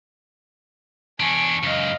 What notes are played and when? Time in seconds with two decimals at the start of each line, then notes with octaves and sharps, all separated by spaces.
1.20 E2 D4 G#5 C#6
1.63 C#2 F#2 D#5 F5